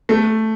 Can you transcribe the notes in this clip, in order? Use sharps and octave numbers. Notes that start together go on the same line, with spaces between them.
A3